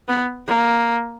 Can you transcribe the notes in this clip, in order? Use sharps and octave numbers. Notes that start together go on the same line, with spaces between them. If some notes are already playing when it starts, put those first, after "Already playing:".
B3
A#3